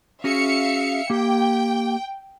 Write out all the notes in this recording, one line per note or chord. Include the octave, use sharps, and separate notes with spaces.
C#4 F#4 G#4 E5 F5 C#7
A#3 G4 G5